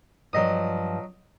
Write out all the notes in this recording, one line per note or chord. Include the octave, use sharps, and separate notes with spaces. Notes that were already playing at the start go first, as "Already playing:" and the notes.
G2 F3 F#3 D#5 D#6